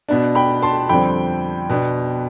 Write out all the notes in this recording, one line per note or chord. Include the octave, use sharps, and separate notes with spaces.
B2 B3 D4
G5 B5
A5 C6
F2 D3 G3 C4 G5 B5
B2 B3 D4